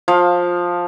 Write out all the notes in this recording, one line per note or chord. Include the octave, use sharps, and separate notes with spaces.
F3 F5